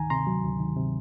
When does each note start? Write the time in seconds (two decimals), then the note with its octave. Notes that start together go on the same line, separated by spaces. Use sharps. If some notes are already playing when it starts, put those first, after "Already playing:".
Already playing: D2 D#3 G#5 A#5
0.10 C3 A#5 C6
0.27 F#3
0.44 D2
0.60 D#3
0.77 C3